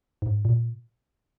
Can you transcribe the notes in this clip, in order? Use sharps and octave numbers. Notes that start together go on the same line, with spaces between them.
G#2
A#2